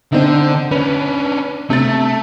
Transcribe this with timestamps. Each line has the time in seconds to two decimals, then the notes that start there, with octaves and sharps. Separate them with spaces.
0.12 D3 C4 D4 D#4
0.71 C#4 D4 B4
1.70 C3 A3 A6